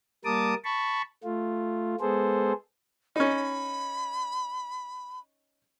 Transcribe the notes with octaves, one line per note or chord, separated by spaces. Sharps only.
G3 A#3 A#4 A5 D6 D#6
A5 B5 C#6
A3 F4
G#3 B3 G#4 A4 C5
C#4 D#4 B5